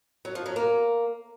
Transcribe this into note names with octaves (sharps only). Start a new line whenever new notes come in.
F#3
F3
F#3
A#3